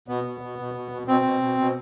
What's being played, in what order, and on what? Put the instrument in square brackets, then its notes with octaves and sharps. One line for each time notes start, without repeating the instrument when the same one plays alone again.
[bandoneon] B2 B3
B2
B2
B2
B2
B2
B2 C4
B2
B2
B2